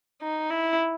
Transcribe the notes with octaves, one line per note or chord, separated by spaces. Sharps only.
D#4
E4